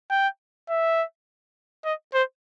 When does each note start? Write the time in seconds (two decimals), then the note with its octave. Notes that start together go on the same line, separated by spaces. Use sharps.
0.10 G5
0.69 E5
1.85 D#5
2.14 C5